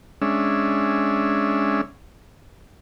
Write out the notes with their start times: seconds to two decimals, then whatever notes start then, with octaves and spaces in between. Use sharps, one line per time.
0.22 G#3 C#4 D4 E5